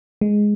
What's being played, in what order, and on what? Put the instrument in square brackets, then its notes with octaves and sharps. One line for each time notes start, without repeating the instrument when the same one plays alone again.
[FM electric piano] G#3